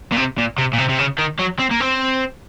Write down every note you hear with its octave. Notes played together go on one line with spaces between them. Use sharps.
A#2
C3
A#2
C3
A#2
C3
C3
C#3
D#3
F#3
C4
A#3
C4